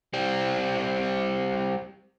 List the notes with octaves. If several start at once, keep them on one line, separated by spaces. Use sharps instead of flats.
G3 C4